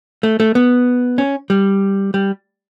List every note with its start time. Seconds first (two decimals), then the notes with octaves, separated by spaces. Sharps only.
0.23 A3
0.40 A3
0.55 B3
1.18 C#4
1.50 G3
2.14 G3